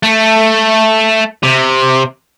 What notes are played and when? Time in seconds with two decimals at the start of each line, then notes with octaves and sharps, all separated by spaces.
0.03 A3
1.43 C3